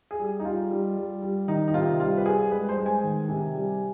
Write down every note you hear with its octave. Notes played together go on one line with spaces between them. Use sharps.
G#4
G3
D#4
G3 F4
G3
G3
G3
D#3 D#4
D#4
C3 F4
G3 F4
B4
G3 G#4
G#3 B4
C5
G#3
G#5
D#3
C3
G3